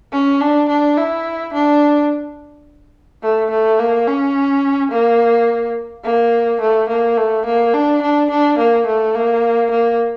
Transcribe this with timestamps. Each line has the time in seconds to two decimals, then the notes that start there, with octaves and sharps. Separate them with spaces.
0.12 C#4
0.41 D4
0.69 D4
0.97 E4
1.53 D4
3.22 A3
3.50 A3
3.79 A#3
4.07 C#4
4.91 A#3
6.04 A#3
6.61 A3
6.89 A#3
7.17 A3
7.46 A#3
7.74 D4
8.02 D4
8.30 D4
8.58 A#3
8.86 A3
9.15 A#3
9.71 A#3